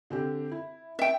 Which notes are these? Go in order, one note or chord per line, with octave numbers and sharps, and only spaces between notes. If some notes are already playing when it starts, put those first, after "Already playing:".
D3 C4 G4
E4
E5 G5